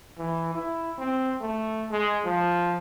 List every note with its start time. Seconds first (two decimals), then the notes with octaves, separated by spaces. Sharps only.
0.18 E3
0.55 E4
0.98 C4
1.41 A3
1.91 G#3
2.25 F3